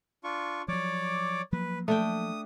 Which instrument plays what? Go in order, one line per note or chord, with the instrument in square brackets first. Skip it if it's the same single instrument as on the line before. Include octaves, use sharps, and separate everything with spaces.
[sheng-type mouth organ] D4 F4 C#6
[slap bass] F3 F#3 [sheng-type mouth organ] C#5 D5 D6
[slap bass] F3 F#3 A#3 [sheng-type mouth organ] B4
[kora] A3 D4 G5 [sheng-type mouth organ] D#6